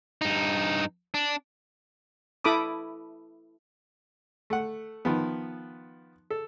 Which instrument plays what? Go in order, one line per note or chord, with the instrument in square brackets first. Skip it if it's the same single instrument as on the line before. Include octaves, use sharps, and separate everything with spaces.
[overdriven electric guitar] G2 D#4
D4
[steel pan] E4 A4 B5 D6 D#6
[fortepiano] A3 F#5
D#3 F3 B3
A4